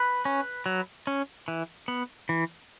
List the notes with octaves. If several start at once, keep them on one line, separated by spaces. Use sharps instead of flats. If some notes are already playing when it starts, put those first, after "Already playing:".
Already playing: B4
C#4
F#3
C#4
E3
B3
E3